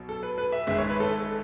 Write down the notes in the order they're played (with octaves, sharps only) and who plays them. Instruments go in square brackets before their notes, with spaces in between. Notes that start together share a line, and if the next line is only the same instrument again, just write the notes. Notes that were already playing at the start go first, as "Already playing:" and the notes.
Already playing: [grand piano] B1 B2 F#3
A4
B4
B4
E5
G#1 G#2 G#3 E5
C#5
B4
A4